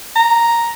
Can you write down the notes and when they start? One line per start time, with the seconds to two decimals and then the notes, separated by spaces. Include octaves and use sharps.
0.16 A#5